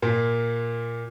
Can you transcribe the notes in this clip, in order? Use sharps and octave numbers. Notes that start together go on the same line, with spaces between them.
A#2 A#3